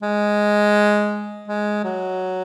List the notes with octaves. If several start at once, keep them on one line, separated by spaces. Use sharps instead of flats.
G#3
G#3
F#3